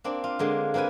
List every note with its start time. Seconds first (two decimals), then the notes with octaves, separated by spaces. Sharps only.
0.04 A#3 C4 D4 D5
0.24 F4
0.39 D3 G#3 A#3
0.74 A#3 C4 A#4 B4 G#5